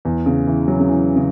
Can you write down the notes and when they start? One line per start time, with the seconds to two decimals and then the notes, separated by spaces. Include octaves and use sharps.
0.05 E2
0.26 C#3
0.47 E3
0.68 F#3
0.80 C#3
0.89 E3
1.16 C#3